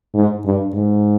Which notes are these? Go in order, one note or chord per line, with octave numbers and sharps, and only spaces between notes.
G#2
G2
G#2